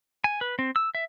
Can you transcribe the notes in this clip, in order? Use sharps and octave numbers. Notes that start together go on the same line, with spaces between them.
G#5
B4
C4
E6
E5